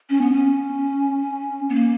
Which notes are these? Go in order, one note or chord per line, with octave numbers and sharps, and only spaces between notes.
C#4
B3
C#4
B3
A#3